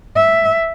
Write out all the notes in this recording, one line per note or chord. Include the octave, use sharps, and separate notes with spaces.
E5